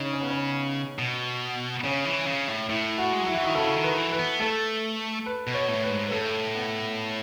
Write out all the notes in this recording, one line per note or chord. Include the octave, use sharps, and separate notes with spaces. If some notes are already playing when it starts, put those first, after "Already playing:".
Already playing: C#3 C#4 D#4
C#4
B3
C#4
B2
C#3 C#4
E3
C#3
A2
A2 E4
F#4
G#3
F#3 E4
E3 F#4
D#3 E4
C#3 A4
D#3
B4
E3
B4
B3
A3 A4
B4
B2
C#5
A2
B4
G#2
B4
A2 A4
B3